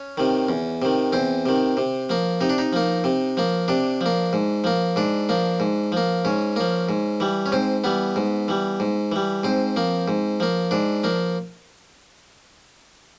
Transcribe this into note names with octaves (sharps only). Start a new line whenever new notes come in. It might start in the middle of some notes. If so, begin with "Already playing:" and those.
Already playing: C#4
C3 D#3
E2
C3 D#3
E2 C4
C3 D#3
C3
F3 A#3
C3 D#4
D4
D#4
F3 A#3
C3
F3 A#3
C3 D4
F3 A#3
G#2
F3 A#3
G#2 D4
F3 A#3
G#2
F3 A#3
G#2 C#4
F3 A#3
G#2
E3 G3
C#4
G#2 C4
E3 G3 B3
G#2
E3 G3
G#2
E3 G3
G#2 C4
F3 A#3
G#2
F3 A#3
G#2 D4
F3 A#3